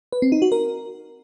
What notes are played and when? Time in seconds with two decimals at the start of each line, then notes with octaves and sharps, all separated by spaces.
0.12 B4
0.22 C4
0.32 D#4
0.42 F#4
0.52 A#4